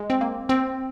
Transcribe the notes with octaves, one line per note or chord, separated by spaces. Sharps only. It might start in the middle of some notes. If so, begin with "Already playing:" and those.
Already playing: G#3
C4
A#3
C4